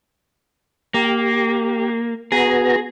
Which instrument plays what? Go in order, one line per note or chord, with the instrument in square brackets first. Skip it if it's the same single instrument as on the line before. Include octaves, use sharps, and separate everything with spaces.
[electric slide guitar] A#3 [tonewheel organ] G4
[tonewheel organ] B3 F#4 A#5 [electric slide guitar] G#4